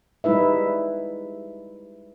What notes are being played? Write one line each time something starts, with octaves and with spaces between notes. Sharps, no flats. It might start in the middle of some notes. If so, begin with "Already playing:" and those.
G3 G#3 D#4 E4 B4 E5